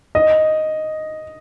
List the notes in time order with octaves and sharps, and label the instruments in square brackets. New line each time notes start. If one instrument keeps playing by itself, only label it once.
[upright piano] D#5